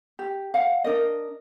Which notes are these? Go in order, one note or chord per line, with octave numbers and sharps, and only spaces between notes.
G4
F5 F#5
D4 A#4 D#5